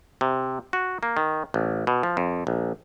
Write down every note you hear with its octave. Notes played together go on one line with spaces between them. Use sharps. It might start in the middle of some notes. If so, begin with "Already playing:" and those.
C3
F#4
A#3
D#3
A1
B2
F3
F2
A#1